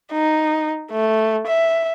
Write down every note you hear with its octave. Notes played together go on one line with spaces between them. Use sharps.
D#4
A3
E5